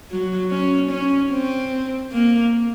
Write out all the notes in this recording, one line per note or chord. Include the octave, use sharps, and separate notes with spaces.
F#3
C#4
C#4
C4
A#3